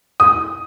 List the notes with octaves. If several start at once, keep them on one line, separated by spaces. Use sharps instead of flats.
D#6